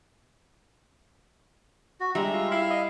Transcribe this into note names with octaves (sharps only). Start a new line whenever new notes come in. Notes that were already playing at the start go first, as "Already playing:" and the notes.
F#4
G3 G#3 D4 E5 A#5
F4
E4 F5
D#5